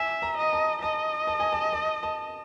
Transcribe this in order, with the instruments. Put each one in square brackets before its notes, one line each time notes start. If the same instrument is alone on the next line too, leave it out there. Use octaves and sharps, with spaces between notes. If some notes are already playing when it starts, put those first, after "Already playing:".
Already playing: [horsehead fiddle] E5 [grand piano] G#5
[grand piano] A#5
[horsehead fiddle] D#5
[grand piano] A5
[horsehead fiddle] D#5 [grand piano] A5
[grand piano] A5
G#5
A5
A5
A5